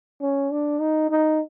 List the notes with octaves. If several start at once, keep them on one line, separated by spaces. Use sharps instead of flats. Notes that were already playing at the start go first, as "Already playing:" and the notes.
C#4
D4
D#4
D#4